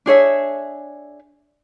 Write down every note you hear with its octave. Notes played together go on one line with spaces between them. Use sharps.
D4 G#4 C#5 E5